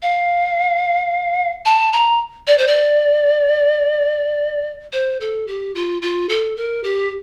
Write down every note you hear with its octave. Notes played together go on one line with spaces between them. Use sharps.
F5
A5
A#5
D5
C5
D5
C5
A4
G4
F4
F4
A4
A#4
G4